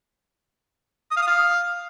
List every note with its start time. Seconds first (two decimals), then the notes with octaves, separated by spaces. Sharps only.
1.11 D#6
1.16 F5
1.22 D#6
1.27 F5